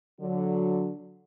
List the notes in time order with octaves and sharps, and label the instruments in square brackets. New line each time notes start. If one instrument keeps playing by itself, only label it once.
[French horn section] D3 F#3